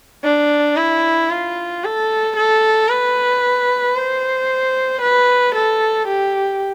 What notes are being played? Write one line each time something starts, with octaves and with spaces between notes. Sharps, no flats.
D4
E4
F4
A4
A4
B4
C5
B4
A4
G4